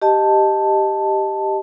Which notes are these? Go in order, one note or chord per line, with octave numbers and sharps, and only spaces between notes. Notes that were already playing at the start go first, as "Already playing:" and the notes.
G4 D#5 A5